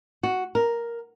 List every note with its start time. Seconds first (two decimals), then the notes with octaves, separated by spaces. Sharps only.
0.23 F#4
0.55 A#4